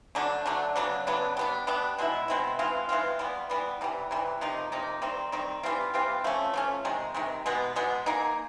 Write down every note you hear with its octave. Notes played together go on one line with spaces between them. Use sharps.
D3 F#3 A3 D4
D3 F#3 A3 D4
C#3 F#3 B3 D4
C#3 F#3 B3 D4
G3 B3 D4
G3 B3 D4
B2 G#3 C4 E4
B2 G#3 C4 E4
E3 G#3 C4 F4
E3 G#3 C4 F4
E3 G3 B3
E3 G3 B3
C3 E3 G3
C3 E3 G3
C3 F3 A#3 D#4
C3 F3 A#3 D#4
D#3 G3 C4
D#3 G3 C4
E3 G3 C4 F4
E3 G3 C4 F4
F3 A3 C#4
F3 A3 C#4
C3 D#3 G#3
C3 D#3 G#3
B2 G#3 B3
B2 G#3 B3
A#3 D#4 G#4